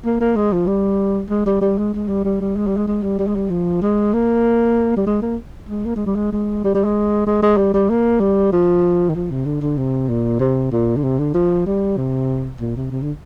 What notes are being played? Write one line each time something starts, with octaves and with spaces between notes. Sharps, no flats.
A#3
A#3
G#3
F3
G3
G#3
G3
G3
G#3
G#3
G3
G3
G3
G#3
G3
G#3
G#3
G3
G3
G#3
G3
F3
G#3
A#3
G3
G#3
A#3
G#3
A#3
G#3
G3
G#3
G#3
G3
G3
G#3
G#3
G#3
G3
G3
A#3
G3
F3
D#3
F3
C3
D3
D3
C3
A#2
C3
A#2
D3
C3
D3
F3
G3
C3
A#2
C3
C3
D3